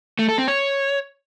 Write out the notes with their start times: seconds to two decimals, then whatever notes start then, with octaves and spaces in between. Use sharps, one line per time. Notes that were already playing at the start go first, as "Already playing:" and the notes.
0.19 A3
0.28 A4
0.38 C4
0.48 C#5